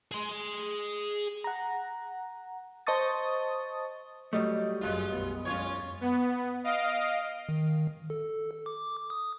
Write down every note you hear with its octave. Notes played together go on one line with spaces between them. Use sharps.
G#4 C6
F#5 A#5
C5 D#5 A5 C#6 D#6 A6
F#3 G3 A3 D#5
G1 F#2 G#3 F4
B1 B3
F#2 G#3 C#4 F4 C#5
B3
D#5 F5 D7
D#3
A4
D6
D#6